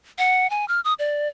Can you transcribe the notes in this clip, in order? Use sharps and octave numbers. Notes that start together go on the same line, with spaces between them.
F#5
G#5
F6
D#6
D5